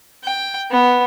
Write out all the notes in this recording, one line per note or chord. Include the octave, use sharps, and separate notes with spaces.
G5
B3